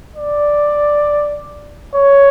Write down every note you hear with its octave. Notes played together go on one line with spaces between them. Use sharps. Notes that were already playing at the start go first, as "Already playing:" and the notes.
D5
C#5